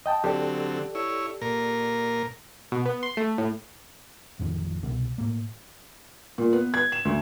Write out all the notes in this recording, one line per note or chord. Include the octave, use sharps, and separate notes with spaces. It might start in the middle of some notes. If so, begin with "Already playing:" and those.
D#5 G5 A5
D3 F#3 C4 G4 A4 D5
E4 C#5
A#2 A#4
B2
B3
C6
A3
A2
A1 F2 D#3 F3
C2 B2
A2 A#3
A#2
B3
G#6
E7
D2